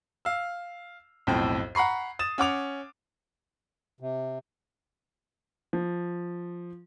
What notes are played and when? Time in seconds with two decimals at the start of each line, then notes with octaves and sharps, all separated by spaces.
0.25 F5 E6
1.27 B1 F2 A2 G5
1.75 F#5 A#5 B5 C#6 C7
2.19 D#6 A6 E7
2.38 C#4 F#5 D6 F7
4.00 C3
5.73 F3